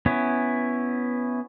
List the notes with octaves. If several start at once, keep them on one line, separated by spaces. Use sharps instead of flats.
B3 C#4 E4